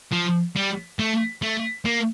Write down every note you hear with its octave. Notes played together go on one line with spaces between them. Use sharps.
F3
G3
A3
A3
A#3